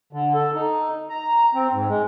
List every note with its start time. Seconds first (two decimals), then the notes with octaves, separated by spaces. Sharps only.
0.13 D3
0.34 A4
0.54 D#4
1.09 A#5
1.55 C4
1.73 G#2
1.89 G#3